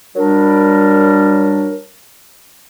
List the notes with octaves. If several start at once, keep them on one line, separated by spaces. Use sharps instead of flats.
F#3 G3 D4 A#4